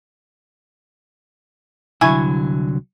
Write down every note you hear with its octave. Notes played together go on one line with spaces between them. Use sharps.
C2 D3 F#3 E4 G#5 C#6